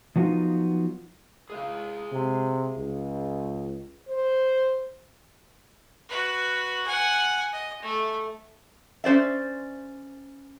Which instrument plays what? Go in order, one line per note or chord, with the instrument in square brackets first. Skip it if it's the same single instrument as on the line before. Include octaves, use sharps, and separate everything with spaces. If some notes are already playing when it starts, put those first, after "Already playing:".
[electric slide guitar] F3 F#3 B3 C#4 D#4 F4
G#4 D#5 F5
[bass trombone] C3
C#2
[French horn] C5
[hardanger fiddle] F#4 B4
F#5 G#5
D#5
A3
[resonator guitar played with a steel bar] C#4 C5 D5 E5